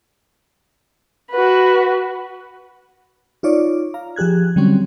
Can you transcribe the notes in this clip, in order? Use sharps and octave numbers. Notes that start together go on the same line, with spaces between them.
F#4 B4
D#4 F4 C#5 D5
F5 A#5
F3 G4 G#4 F#6 G#6
D3 F#3 G3 C4 C#4